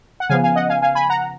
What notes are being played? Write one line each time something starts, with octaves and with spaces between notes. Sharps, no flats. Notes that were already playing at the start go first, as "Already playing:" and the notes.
F#5
C#3 F3 B3 F5 G#5
F5 G#5
D#5 F#5
F5 G#5
F5 G#5
G#5 B5
F#5 A#5